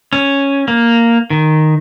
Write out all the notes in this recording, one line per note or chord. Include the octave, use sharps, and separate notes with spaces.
C#4
A#3
D#3